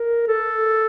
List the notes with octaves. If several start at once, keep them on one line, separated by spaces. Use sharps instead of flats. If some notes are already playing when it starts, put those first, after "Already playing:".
Already playing: A#4
A4